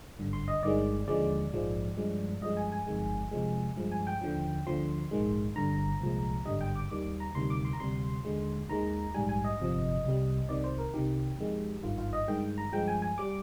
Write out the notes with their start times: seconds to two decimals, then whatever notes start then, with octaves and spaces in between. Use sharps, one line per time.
0.18 G#1 G2 D3
0.33 C6
0.48 D#5
0.63 G1 G2 D#3 G#3 D5
1.07 D#2 D3 F3 G#3 D5
1.52 A#1 G#2 F3 G#3
1.97 G2 F3 G#3
2.42 G2 F3 G#3 D#5
2.57 G#5
2.72 G#5
2.87 G1 F2 D#3 G#3
3.31 F2 C3 F3 G#3
3.77 G2 F3 G#3
3.92 G#5
4.07 G5
4.21 D#2 D3 F3
4.67 D2 D3 F3 C6
5.11 A#1 G#2 D#3 G#3
5.56 G1 G2 D3 A#5
6.01 C2 A#2 F3 G#3
6.45 G#1 G2 D3 G3 D#5
6.61 G5
6.76 D6
6.90 D#2 D#3 G3 D6
7.20 A#5
7.35 D2 C3 D#3 G3 C6
7.50 D6
7.65 C6
7.73 A#5
7.80 D2 C3 G3 C6
8.25 D#2 D3 G#3
8.69 D#2 D#3 G#3 A#5
9.14 A#1 G#2 G3 G#5
9.29 G#5
9.44 D#5
9.59 G1 F2 C3 F3
10.04 C2 C3 G3
10.49 C2 C3 D#3 D5
10.64 C5
10.78 A#4
10.94 C2 C3 D#3 G4
11.38 F2 D#3 G#3
11.83 G#1 G2 D#3 F4
11.98 F4
12.13 D#5
12.28 G2 D#3 G#3 G5
12.58 A#5
12.73 G2 F3 G#3 G5
12.88 G#5
13.02 G#5
13.18 G3 D6